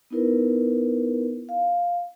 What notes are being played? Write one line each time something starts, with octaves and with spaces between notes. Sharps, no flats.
B3 D#4 E4 A#4 B4
F5